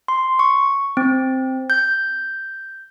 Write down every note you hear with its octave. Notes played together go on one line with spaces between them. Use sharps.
C6
C#6
C4
G6